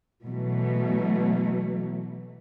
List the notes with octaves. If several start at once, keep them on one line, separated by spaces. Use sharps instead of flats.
B2 E3 F#3 A3